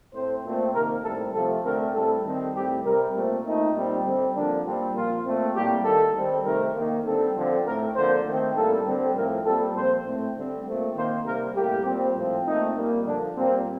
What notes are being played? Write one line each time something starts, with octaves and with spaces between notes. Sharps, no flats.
A2 A3 C4 C5
A#2 A3 C4
C3 D#3 A#3 A#4
A2 G3 C4 A4
C3 F3 A3 C4 A4
D3 A3 C4 A#4
A2 G3 C4 A4
D#3 G3 C4
A2 G3 C4 G4
C3 G3 C4 A#4
A#2 A3 C4
A#2 A3 C4 D#4
A#2 G3 C4
D3 G3 C4
D3 F3 A#3 D4
A#2 G3 C4
A#2 F3 A#3 F4
A#2 A3 C4
A2 G3 A#3 G4
D#3 G3 A#3 A4
D#3 G3 C4
C3 D#3 A3 C4 A#4
D#3 A#3
D3 G3 C4 A4
D3 F3 C4
A2 A3 C4 A#4
D3 F3 A#3 C5
D#3 A3 C4
A2 G3 A#3 A4
D3 G3 C4
A2 F3 C4 A#4
A#2 G3 C4 A4
A#2 F3 C4 C5
A2 A3 C4
D3 G3 C4
A#2 A3 C4
D#3 A#3 C5
C3 G3 A#3 A#4
A2 G3 A#3 G4
A#2 G3 C4
A2 F3 C4
A#2 A3 C4 D#4
A#2 G3 A#3
D3 F3 A#3 D4
A#2 G3 A#3 C4